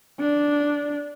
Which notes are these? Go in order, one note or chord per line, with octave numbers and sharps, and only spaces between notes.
D4